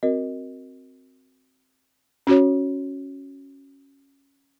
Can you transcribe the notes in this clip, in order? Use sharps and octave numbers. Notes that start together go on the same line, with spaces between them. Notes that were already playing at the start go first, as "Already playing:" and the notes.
C4 F#4 A#4 D#5
C#4 F#4 C#5